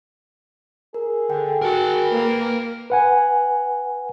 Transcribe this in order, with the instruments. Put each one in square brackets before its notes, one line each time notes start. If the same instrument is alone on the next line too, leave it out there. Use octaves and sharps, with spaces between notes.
[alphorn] G#4 [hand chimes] A#4
[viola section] D3 [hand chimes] G5
[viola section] F#4 [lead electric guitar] A#4 A5
[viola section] A#3 [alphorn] B4
[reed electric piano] B4 F#5 G#5